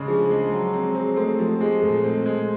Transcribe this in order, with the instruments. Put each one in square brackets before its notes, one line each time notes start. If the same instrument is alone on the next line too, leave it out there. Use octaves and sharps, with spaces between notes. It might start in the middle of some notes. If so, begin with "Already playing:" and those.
Already playing: [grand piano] C#3 G#3 D4
[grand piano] F3 [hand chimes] G#4
[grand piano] G#3
F#3
C4
[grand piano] C4 [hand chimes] G#4
[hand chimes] A3 A4 [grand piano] C4
[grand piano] F3 [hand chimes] G4
[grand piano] G#3 [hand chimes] G#4
[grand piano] A#2 [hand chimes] A3 A4
[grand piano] C4
G#3